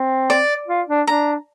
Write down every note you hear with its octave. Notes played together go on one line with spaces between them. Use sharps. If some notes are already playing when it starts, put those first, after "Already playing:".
Already playing: C4
D5
F4
D4
D4 A#5